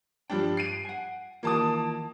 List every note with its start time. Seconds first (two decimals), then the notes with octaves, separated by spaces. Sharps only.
0.30 G2 F3 G3 D4 G5
0.57 C7 D7 D#7
0.85 F#5 G#5
1.43 D#3 E3 A#3 F4 A5 D#6